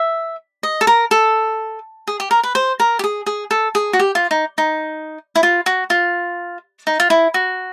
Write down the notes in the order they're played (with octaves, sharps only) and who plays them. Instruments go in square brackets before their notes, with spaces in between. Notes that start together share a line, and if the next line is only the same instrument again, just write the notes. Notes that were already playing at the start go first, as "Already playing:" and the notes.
Already playing: [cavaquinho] E5
D#5
A4
A#4
A4
G#4
G4
A#4
B4
C5
A#4
G4
G#4
G#4
A4
G#4
F#4
G4
F4
D#4
D#4
E4
F4
F#4
F4
D#4
F4
E4
F#4